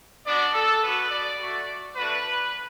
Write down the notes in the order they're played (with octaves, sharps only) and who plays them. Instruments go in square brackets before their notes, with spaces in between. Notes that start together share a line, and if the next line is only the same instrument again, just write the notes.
[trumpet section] B3 D4 F#4 D5
A4
B3 F#4 B4
D5
A3 F#4
A3 D4 F#4 B4